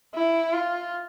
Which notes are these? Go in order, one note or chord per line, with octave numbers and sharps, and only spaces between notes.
E4
F4